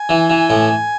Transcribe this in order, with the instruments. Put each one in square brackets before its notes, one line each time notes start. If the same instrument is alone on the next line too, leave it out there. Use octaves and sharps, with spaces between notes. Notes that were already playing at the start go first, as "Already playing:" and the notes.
Already playing: [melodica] G#5
[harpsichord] E3
E3
A2